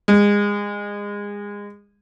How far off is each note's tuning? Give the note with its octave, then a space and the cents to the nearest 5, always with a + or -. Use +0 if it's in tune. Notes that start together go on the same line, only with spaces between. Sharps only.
G#3 -25